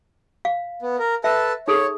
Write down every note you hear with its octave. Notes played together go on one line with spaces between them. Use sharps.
F5
B3
A#4
A4 B4 E5 A5
D#4 G#4 A4 C#5